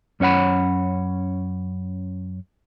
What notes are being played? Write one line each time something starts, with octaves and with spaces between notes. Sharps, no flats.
F#2 C#4 C#5 F#5 B5